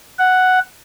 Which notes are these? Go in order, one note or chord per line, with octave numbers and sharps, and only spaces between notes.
F#5